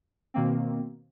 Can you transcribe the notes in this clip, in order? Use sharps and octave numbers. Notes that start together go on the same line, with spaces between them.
B2 D#3 A#3 C4